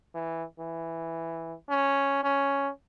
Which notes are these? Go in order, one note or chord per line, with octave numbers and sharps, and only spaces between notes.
E3
E3
C#4
C#4